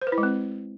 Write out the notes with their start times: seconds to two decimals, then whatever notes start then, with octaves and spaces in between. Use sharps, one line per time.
0.02 C5
0.07 B4
0.12 E4
0.18 G#3
0.23 C4